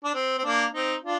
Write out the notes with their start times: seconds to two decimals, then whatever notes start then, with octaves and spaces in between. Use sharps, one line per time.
0.04 D4
0.14 C4
0.38 C4
0.44 A#3 D4
0.74 C4 D#4
1.04 D4 F4